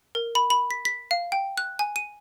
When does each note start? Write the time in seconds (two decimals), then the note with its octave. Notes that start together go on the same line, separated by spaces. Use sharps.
0.15 A#4
0.35 B5
0.50 B5
0.71 B6
0.85 B6
1.11 F5
1.32 G5
1.57 F#6
1.79 G#5
1.96 D#7